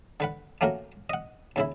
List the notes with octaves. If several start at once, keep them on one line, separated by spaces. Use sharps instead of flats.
D3 B4 F#5
A3 A#3 C#4 F#4 A#4
D#5 F#5
D#2 C#3 E4